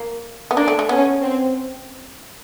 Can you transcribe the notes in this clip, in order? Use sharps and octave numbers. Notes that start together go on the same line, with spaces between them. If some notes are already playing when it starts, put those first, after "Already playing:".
Already playing: A#3
B3
A#3 D4
A3
A3
B3 C#4
C4